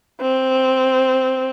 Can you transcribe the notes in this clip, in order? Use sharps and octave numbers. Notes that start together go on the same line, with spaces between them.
C4